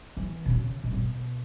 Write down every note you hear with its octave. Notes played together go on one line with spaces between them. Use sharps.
E3
B2
C#3
B2
C#3
B2